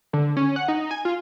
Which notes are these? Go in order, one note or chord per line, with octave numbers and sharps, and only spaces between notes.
D3
C#4
F#5
D#4
G#5
F4